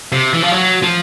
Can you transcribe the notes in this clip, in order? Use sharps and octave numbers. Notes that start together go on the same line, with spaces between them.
C3
E3
F3
F#3
F3